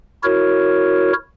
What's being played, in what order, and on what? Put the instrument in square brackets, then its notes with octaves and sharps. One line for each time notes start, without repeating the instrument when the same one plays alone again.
[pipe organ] E4 F#4 A#4 C#5